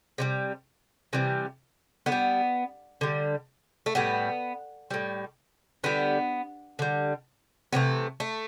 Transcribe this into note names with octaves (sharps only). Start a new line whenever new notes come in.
C3 E3 G3
C3 E3 G3
D3 B3
G3
D3 G3
A3
A2 G3 B3
A2 G3
D3 G3 B3
D3 G3
C3 E3 A3 B3
A3